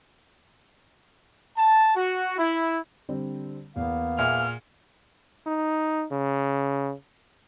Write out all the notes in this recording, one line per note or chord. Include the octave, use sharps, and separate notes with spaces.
A5
F#4
E4
D3 G3 C4
E2 A#3 B3 F5
A#2 G#4 E5 F#5 F6
D#4
C#3